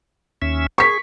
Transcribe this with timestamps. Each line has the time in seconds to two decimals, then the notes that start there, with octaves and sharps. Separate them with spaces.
0.42 D#2 C#4 E5
0.78 G#4 C#6 B6